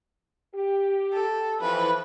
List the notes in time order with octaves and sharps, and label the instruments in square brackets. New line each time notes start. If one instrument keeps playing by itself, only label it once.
[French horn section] G4
[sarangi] A4
[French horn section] F2 E3 [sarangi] B4